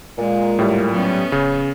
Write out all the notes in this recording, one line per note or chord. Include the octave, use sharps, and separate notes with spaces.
A#2 G#3
A2 G3
F#3 B3 C#4
D1 C#3